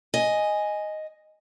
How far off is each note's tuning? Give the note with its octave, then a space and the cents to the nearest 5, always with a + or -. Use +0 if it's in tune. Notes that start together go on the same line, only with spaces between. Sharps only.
D#5 +0 G#5 +0